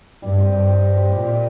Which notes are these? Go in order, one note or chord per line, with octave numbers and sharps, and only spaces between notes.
G2 G3
C4 G4 D#5
G2 G3
C4 G4 D#5
G3
C4 G4 D#5
A#2 G3
C4 G4 D#5